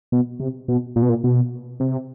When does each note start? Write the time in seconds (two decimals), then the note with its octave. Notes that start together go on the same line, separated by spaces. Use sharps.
0.12 B2
0.40 C3
0.68 B2
0.96 A#2
1.02 B2
1.09 A#2
1.24 B2
1.80 C3